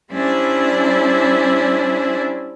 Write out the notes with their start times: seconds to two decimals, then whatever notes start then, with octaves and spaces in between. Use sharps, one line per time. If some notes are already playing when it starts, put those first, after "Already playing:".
0.11 G3 C#4 D4 E4 C5 D5